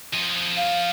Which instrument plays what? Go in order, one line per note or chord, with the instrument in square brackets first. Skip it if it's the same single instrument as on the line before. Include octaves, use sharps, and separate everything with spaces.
[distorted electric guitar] F3 D#5
[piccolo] F5